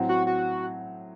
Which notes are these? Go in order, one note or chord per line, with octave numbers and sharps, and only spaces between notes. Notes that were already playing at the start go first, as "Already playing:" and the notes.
Already playing: A2 F#3 C4
F#4
F#4